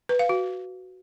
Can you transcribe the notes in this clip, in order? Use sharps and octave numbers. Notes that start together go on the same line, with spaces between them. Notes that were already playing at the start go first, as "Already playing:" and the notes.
B4
F5
F#4